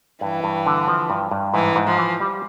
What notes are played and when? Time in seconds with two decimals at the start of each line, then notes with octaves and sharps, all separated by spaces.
0.21 G2 E3
0.44 G2
0.66 D3
0.88 F3
1.10 G2
1.31 G2
1.54 G#2 E3
1.76 G#2
1.87 F3
1.99 E3
2.20 G3